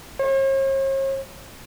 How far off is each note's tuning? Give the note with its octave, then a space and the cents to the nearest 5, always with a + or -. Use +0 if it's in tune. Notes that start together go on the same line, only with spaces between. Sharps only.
C#5 -45